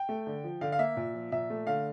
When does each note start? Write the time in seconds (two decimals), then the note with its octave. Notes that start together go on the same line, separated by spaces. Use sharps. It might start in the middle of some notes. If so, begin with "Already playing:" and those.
Already playing: G5
0.09 A3
0.27 D3
0.44 F3
0.61 D3 F5
0.72 F5
0.79 A#3 E5
0.97 A#2
1.14 F3
1.32 A#2 E5
1.50 A3
1.67 D3 F5